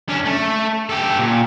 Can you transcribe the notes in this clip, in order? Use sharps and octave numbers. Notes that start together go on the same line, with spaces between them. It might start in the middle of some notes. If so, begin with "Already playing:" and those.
C#4 D4
A3
G4 A4
A#2